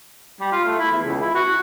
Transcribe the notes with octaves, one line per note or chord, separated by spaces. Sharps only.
G3
F4
A3
E4
E2
C#2
E4
F#4